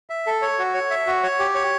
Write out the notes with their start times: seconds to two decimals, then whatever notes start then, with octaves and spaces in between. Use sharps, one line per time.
0.10 E5
0.27 A4
0.42 C#5
0.59 F#4
0.74 C#5
0.91 E5
1.07 F#4
1.23 C#5
1.39 G4
1.55 C#5